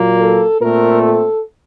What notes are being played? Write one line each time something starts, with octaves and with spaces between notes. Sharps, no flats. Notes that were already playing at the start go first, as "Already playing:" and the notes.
Already playing: A#2 F#3 A#3
A4
A#2 A3 C4 A#4
A4